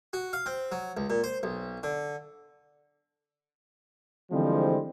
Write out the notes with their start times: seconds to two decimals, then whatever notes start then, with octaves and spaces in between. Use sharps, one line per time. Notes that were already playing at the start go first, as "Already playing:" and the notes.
0.13 F#4
0.33 F5
0.46 C4
0.72 F#3
0.97 C#2
1.10 A#2
1.24 C5
1.43 B1
1.83 D3
4.31 D3 E3 F3 G3 G#3 C4